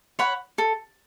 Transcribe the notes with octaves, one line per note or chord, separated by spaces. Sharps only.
C#5 F#5 B5
A4